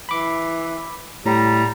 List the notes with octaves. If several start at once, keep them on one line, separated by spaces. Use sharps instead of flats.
E3 B5 D6
A2 G3 A#5